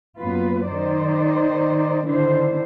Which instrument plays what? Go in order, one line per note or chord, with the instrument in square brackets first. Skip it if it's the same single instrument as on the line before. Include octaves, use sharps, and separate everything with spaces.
[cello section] F#2 A#3 B3 F4 B4
D#3 D#4 C5 D5
D3 D#3 D4 E4 C5